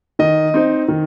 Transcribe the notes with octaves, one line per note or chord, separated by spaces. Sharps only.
D#3 D#5
C4 D#4
D#3